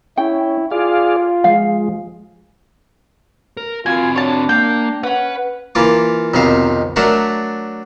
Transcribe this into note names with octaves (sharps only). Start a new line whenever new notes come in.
C#4 E4 G5
F4 G#4 D5 F5
F3 G#3 F5
A#4
C4 F4 F#4 G#5
D4 C#5 A5
A#3 G5
C#4 B4 F#5
E3 A#3 F4 D6
B1 F2 C3 D#3 F5
F#3 A3 D4 A#4 E5 F#5